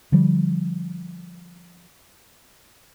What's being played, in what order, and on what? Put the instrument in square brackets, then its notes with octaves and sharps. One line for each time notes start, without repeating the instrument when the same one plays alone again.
[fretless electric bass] D3 F3 G3